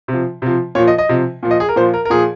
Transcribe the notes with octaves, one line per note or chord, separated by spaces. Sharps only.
C3 F3
C3 F3
A#2 F3 C#5
D#5
D#5
C3 F3
A#2 F3
D#5
G#4
A#4
A#2 F3 C5
A#4
A#4
A#2 F3 G#4